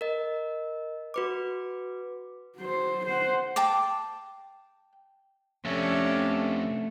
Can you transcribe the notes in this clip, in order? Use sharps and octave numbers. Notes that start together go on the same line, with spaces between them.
A#4 D#5
F#4 B4 D6
F#3 C5
C5 F#5
G5 A5 D6
F2 C3 A3 C#4 D4